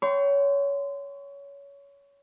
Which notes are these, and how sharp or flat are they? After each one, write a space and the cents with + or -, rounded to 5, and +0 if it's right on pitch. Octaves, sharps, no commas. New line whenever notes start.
C#5 +20 G5 -15 C6 -25